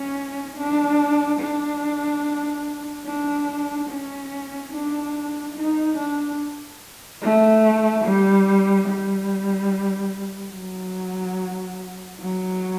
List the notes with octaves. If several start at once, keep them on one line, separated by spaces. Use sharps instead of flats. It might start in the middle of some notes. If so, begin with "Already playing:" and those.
Already playing: C#4
D4
D4
D4
C#4
D4
D#4
D4
A3
G3
G3
F#3
F#3